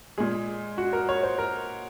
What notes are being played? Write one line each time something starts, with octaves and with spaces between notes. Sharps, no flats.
A#2 G#3 G#4
F#4
A#4
C#5
C5
A#4